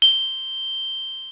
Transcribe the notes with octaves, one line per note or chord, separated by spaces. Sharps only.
G7